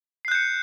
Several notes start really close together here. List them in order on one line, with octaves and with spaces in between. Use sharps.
C7 F#6 G6 C#7